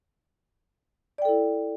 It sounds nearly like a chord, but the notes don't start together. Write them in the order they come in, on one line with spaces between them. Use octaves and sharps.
D5 G5 A4 E4